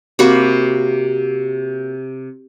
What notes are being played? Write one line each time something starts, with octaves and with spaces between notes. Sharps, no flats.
C3 A#3 F#4 B5